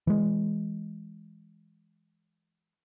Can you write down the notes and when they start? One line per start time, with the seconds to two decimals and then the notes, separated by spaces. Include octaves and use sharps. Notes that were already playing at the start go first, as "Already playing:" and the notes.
0.07 E3 G#3